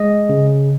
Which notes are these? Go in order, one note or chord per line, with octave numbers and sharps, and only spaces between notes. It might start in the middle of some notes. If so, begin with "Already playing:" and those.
Already playing: G#3 D#5
C#3